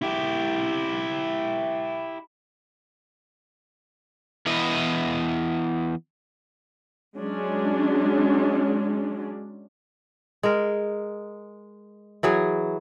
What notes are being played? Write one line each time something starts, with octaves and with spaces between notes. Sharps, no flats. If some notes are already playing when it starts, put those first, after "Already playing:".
E4 G4
E3 B3 E4 D#5
F#3 G#3 C#4 D4
G#3 A#4
E3 F#3 G#4